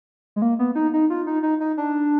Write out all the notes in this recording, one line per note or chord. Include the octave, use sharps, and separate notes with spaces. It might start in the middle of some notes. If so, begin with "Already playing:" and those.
G#3
A#3
B3
D#4
D#4
F4
D#4
D#4
D#4
D4